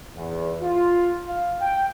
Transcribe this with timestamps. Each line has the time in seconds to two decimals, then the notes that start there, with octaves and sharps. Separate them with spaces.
0.16 E2
0.62 F4
1.28 F5
1.61 G5